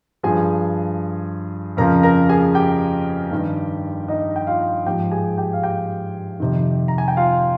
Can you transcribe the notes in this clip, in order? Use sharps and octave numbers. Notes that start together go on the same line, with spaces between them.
G2 F3 G#4 G#5
F2 C#3 F3 A#4 A#5
A#4 A#5
G#4 G#5
G4 G5
G2 D#3
D#4 D#5
G5
F4 F5
G#2 F3 G4 G5
G#4 G#5
G4 G5
F5
G4 G5
F2 C3 D#3
A#5
G#5
G5
F4 F5